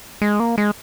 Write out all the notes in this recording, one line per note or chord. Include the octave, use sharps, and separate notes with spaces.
G#3
A#3
G#3